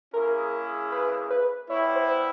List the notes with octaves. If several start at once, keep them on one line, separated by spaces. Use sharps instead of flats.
A#3 C#4 E4 G#4 A#4
B4
B4
G3 B3 E4 C#5
C5